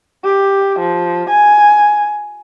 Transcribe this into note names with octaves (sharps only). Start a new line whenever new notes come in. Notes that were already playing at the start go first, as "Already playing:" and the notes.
G4
F3
G#5